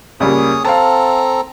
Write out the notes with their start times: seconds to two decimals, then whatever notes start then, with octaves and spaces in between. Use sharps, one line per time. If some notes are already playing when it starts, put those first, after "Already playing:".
0.20 C#2 G3 A#3 G#4 C#5 D#6
0.65 C4 A4 F5 A5 A#5